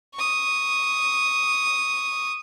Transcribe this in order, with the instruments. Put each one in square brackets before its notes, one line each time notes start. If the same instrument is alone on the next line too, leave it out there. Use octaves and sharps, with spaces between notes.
[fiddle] C#6 D#6